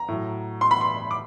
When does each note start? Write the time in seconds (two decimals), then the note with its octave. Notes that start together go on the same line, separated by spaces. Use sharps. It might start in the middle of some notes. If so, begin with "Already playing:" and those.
Already playing: A#5
0.08 A2 F#3
0.61 C6
0.71 B5
0.81 C6
1.11 D6